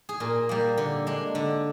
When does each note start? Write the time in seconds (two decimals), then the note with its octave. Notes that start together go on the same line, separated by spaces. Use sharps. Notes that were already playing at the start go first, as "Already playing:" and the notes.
0.09 G#4
0.20 A#2 A#4
0.49 G3 A#3
0.78 D3
1.07 G#3 D4
1.35 D3